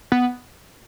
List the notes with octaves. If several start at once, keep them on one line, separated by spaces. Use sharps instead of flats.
B3